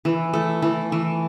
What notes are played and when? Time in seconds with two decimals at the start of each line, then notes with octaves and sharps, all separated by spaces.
0.05 E3
0.33 A3
0.62 E3
0.92 E3